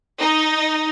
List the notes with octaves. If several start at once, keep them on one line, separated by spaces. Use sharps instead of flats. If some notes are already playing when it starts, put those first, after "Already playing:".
D#4